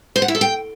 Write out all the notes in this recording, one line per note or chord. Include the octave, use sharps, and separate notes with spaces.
C5
F#5
E4
A4
G5